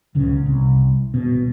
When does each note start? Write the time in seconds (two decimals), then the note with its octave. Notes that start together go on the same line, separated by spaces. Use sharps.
0.15 D1 C#2 C#3
0.46 C2
1.14 D#1 B2